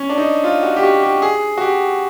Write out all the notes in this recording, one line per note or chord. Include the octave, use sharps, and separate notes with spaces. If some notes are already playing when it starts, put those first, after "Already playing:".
Already playing: C#4
D4
D#4
F4
F#4
G4
F#4
G4
G#4
F#4
G4